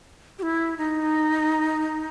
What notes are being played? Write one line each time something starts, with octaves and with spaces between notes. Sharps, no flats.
G4
E4
D#4